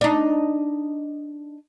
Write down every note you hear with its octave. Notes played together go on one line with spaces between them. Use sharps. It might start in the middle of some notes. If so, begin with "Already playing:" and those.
D4 D#4